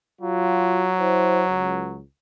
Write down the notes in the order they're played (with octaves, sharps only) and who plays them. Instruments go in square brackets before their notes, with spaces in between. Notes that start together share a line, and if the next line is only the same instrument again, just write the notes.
[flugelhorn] F#3 [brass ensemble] F4 F#4
[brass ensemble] E4 C5
C#2